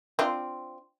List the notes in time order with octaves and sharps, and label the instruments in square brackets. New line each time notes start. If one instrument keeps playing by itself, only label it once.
[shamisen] C4 D4 F4